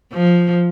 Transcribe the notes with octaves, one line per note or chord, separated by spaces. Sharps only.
F3